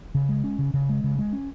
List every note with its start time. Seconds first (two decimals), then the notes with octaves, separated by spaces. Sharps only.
0.15 C#3
0.29 G#3
0.44 C#4
0.59 C#3
0.74 C#3
0.89 G#3
1.04 C#3
1.19 G#3
1.33 C#4